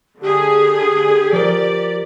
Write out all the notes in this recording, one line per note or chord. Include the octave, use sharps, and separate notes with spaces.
D3 G4 G#4
F3 A#4 D5